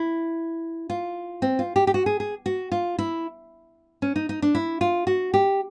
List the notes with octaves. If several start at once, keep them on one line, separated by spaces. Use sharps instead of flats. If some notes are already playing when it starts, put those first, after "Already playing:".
Already playing: E4
F4
C4
F4
G4
G4
F#4
G#4
G#4
F#4
F4
E4
C#4
D#4
D#4
D4
E4
F4
F#4
G4